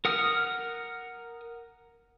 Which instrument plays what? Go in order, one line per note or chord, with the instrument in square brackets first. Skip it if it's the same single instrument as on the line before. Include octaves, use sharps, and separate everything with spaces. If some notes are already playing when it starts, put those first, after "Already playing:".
[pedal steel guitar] A#4 F#5 D#6 F6